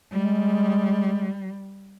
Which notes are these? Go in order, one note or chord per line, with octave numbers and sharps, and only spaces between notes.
G3 G#3